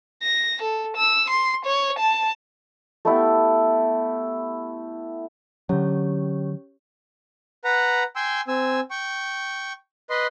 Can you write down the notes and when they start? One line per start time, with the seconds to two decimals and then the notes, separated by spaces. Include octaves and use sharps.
0.23 A#6
0.62 A4
0.96 E6
1.30 C6
1.65 C#5
1.99 A5
3.05 A3 B3 E4 G4
5.69 D3 F#3 C#4 G4 C#5
7.64 B4 F#5 A#5
8.16 G5 G#5 C6 E6
8.48 C4 G#5 E6
8.91 G5 C#6
10.10 B4 D#5 C6